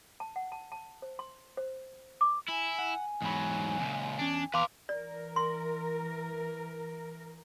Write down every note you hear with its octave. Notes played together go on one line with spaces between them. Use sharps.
A5
F#5
A5
A5
C5
C6
C5
D6
E4 G#5
F#5
E2 G#2 F#3 B5
C#2 A#2
E2 C#4 D4
E2 B4 F5 A#5 C6 D6
E3 A#4 D5
C6